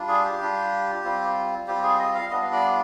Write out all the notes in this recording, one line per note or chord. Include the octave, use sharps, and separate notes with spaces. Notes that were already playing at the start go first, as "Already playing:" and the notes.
Already playing: G3 D4 F4
G#4
G4
G3 D4 F4
G3 C4 F4
G3 C4 F4 G4
G#4
D#5
F5
G3 B3 D4 F4 D#5
D5